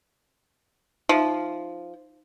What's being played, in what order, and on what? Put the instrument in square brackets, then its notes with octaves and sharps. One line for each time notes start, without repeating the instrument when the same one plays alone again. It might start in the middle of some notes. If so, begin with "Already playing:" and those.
[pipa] F3 [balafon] D#4 E5